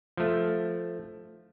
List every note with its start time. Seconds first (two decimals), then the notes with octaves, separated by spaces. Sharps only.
0.17 F3 A3